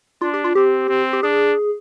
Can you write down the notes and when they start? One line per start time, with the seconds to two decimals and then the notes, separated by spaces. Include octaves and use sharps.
0.21 D4 F4
0.34 G4
0.44 F4
0.55 C4 G4
0.89 C4
1.13 G4
1.23 D4 G#4